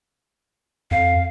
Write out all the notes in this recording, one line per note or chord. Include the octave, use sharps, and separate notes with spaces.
F2 F5